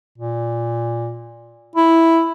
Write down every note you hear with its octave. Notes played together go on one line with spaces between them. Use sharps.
A#2
E4